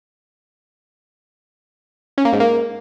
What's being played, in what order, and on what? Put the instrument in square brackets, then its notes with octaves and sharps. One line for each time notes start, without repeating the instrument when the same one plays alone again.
[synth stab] C#4
A#3
G#2
A#3